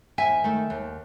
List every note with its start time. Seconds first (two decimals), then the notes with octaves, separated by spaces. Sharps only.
0.18 D#2 E5 G#5
0.44 D#3 A3
0.70 D#2